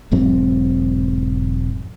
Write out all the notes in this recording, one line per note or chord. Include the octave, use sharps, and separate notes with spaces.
E1 G#2 F#3 C4